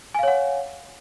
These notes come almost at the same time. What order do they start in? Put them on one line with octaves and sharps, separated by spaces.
G#5 F5 C#5 F#5